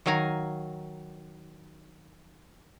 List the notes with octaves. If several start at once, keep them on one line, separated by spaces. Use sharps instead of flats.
D#3 F#3 F5 G#5 A#5